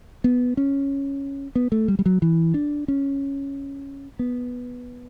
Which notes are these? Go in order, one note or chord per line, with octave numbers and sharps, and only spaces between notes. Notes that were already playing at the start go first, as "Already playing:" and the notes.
B3
C#4
B3
A3
G3
G3
F#3
E3
D4
C#4
B3